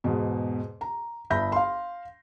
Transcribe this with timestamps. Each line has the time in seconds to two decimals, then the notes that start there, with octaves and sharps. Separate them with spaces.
0.04 E2 G#2 B2
0.81 A#5
1.30 G1 E5 B5 G6 A#6
1.52 F5 C6